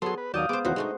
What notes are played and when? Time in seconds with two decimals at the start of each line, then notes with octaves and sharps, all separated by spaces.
0.02 F#3 B3 G#4 A4 C6
0.18 B4
0.34 D#2 F#3 D5 F5 A5 D#6 G6
0.49 G#3 B3 C5 D6
0.65 D#2 B2 E3 F#3 B3 C#4 F#4 C5
0.76 G#3 A3 D4 D#4